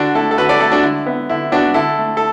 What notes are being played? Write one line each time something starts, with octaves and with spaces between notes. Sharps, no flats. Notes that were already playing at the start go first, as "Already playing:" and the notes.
Already playing: D3 D4 F#4
A3 E4 A4
A4
D3 F#4 B4
A4 D5
A3 E4 A4
D4 F#4
D3 E4
B3
D3 E4
B3 D4 F#4
D3 E4 A4
A3
A4